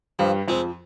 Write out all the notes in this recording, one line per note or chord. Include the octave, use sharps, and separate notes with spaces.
G2 F3 G3
F2 F3 G#3 C4